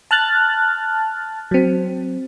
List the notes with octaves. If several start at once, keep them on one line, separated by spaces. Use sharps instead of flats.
A5 F6 F#6 A6
F#3 C4